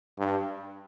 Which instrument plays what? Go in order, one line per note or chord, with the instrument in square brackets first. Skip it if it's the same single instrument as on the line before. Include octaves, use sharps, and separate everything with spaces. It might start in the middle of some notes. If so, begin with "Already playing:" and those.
[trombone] G2